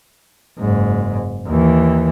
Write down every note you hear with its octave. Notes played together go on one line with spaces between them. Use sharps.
F#1 G#2
D#2 E3